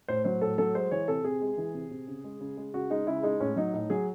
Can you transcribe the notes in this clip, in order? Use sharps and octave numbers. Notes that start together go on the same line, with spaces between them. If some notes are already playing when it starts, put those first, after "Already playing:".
A2 C5
F#3 C5
A2 A4
F#3 A4
G#3 C5
E3 C#5
C3 A4
C3 G#4
G#3
E3
C3
C3
C#3
G#3
C#3
G#3
C#3 F#4
G#3 D#4
C#3 E4
G#3 D#4
A2 C#4
F#3 D#4
A2 D#4
F#3 G#4